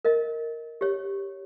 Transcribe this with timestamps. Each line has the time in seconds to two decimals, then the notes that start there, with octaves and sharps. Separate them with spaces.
0.05 A#4 D#5
0.81 G4 C#5